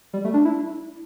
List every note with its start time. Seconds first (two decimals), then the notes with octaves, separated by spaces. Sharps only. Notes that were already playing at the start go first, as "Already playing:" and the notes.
0.13 G3
0.25 A3
0.34 D4
0.45 E4